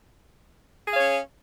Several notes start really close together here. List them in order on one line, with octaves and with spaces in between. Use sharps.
G#4 F5 C#5 C#4